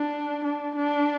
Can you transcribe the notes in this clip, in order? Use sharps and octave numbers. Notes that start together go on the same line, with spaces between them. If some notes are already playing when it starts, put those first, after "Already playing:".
Already playing: D4
D4
D4